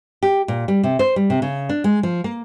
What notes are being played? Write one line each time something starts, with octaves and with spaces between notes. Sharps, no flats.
G4
A#2
G3
C3
C5
G3
C3
C#3
D4
G#3
F3
A#3